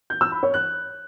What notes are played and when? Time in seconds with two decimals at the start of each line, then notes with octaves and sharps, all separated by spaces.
0.10 G6
0.21 E6
0.32 B5
0.43 C#5
0.54 F#6